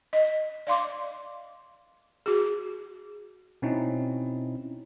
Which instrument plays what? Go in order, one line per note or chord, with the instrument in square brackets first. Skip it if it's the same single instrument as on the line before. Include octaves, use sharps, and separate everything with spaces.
[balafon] D#5
D5 F5 C6 D6
F#4 G#4
[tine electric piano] B2 C4 C#4 D#4 E4